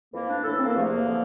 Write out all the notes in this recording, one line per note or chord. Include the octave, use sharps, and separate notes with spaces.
F2 E3 A#3
D4
A2 E3 A4
C4
A#3
E2 C3 F3 A3
A#3
D3 F3